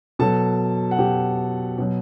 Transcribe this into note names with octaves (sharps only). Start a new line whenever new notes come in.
B2 F#3 A4 A5
F#5
B2 F#3 G4 G5
B2 F#3